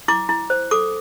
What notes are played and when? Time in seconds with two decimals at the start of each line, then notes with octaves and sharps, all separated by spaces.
0.08 E4 D6
0.29 E4
0.50 C5
0.71 A4 D6